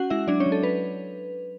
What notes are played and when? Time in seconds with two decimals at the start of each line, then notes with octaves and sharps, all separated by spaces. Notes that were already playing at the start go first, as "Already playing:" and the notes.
Already playing: C#4 F#4 F#5
0.10 G#3 E4 E5
0.27 F#3 D4 D5
0.40 C#4 C#5
0.46 F#3
0.52 A4
0.63 C#4 B4